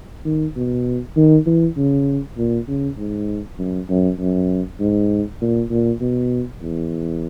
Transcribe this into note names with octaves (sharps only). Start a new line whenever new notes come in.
D#3
B2
D#3
E3
C#3
A#2
C#3
G#2
F#2
F#2
F#2
G#2
A#2
A#2
B2
E2